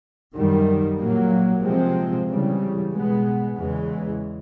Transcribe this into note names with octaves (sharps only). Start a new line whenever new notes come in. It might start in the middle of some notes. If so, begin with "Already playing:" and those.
F#2 D#3 G3
A#2 F#3 A#3
C3 F3 G#3 C4
C#3 E3 G3
B2 G#3 B3
E2 C#3 E3 G#3